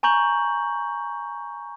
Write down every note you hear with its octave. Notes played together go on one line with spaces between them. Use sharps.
G#5 A#5 C#6 G6 F#7